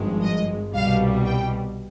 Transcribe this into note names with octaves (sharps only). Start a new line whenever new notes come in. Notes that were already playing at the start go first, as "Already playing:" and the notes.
Already playing: G#1 G2 F3 G#3
D#5
C2 B2 G3 F5
G5